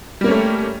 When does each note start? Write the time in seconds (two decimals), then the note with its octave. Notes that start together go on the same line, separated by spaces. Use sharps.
0.21 G3
0.24 A#3
0.28 C#4
0.31 A3